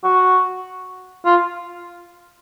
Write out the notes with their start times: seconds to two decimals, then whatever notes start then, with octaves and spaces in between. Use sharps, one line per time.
0.04 F#4
1.25 F4